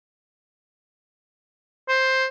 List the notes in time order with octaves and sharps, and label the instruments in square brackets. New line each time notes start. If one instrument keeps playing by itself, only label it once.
[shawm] C5